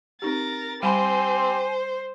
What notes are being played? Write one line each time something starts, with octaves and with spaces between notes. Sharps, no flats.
C4 D#4 G4 A#4 A6
G3 G4 C5 G#5 B5 C6